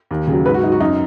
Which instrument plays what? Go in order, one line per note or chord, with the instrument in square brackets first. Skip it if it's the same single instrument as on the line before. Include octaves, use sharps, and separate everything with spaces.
[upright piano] D#2
C#3 F#3
G#2 B4
F#4
F#3 D#4
F#4
F#2 D#4